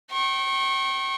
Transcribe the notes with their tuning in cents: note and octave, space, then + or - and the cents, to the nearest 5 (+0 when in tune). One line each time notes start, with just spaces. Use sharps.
G5 -30 C#6 -35